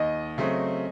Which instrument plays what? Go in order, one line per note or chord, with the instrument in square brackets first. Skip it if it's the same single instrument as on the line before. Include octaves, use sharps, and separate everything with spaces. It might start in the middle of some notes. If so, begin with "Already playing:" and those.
Already playing: [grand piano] D#2 [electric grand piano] D#5
[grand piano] C#3 F#3 A3 C4